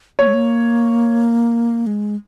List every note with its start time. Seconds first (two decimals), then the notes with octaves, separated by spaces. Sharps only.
0.19 A#3 C#5
0.27 G#3
0.34 A#3
1.87 G#3